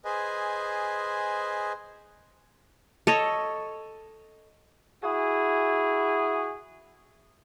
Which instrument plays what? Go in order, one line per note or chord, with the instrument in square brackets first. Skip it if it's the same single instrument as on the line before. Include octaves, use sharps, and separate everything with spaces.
[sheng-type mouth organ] G#4 B4 C5 D#5 G#5
[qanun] A4 C#5 D#5
[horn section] E4 F#4 G#4